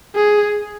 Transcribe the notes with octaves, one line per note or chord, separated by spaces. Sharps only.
G#4